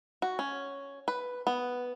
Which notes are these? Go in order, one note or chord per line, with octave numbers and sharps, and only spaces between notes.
F#4
C#4
B4
B3